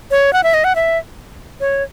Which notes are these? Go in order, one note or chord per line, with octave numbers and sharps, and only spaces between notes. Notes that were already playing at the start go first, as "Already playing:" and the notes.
C#5
F#5
E5
D#5
F#5
E5
C#5